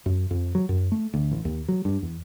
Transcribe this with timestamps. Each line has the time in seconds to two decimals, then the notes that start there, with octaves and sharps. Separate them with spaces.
0.06 F#2
0.31 F2
0.55 F#3
0.69 F#2
0.92 A3
1.14 D2
1.31 A1
1.45 D#2
1.68 F#3
1.85 G2
2.02 E2